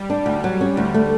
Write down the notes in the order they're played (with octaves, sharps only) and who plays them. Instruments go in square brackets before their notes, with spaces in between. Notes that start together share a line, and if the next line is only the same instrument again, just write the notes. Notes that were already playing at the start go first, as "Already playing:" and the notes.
Already playing: [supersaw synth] G3
[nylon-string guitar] D4
[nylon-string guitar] D2 [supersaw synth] G3
[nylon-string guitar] F#3
C#4
[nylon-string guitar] D2 [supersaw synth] G3
[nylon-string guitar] A3